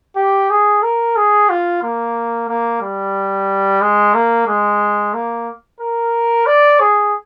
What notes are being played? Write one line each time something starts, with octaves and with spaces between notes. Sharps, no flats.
G4
G#4
A#4
G#4
F4
A#3
A#3
G3
G#3
A#3
G#3
A#3
A#4
D5
G#4